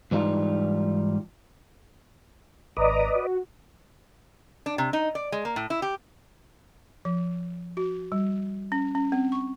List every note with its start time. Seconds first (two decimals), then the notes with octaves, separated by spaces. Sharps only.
0.11 G#2 E3 G3 D#4 F4
2.77 G#1 B4 D5 D#5 A#5 D#6
3.15 F#4
4.66 D4
4.78 C3
4.93 D#4
5.15 D5
5.32 G#3
5.45 A#3
5.56 A2
5.70 E4
5.82 G4
7.05 F3
7.77 F#4
8.12 G3
8.72 C#4
8.95 C#4
9.12 C4
9.32 C#6